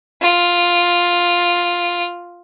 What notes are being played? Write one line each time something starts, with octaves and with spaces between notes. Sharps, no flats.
F4